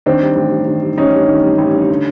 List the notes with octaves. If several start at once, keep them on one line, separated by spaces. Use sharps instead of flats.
D#3 C4 D4
G3
A1
G2
D#3
G3
A1 C#4 D#4
G2
D#3
G3
A1
G2
D3